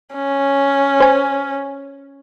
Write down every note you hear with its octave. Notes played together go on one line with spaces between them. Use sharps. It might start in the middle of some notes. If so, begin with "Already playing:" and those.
C#4
C5 G#5